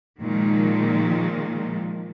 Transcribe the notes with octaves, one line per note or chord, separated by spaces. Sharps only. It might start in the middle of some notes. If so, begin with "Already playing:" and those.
A#2 D#3 F3 G#3